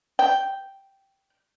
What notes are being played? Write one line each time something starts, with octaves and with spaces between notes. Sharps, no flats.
G5